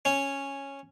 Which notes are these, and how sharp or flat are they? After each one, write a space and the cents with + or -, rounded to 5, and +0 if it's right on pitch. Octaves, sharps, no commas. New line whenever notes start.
C#4 -5